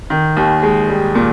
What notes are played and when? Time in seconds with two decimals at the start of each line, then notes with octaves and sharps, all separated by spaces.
0.10 D#3
0.37 D#2
0.63 G#3
0.89 G3
1.15 A#2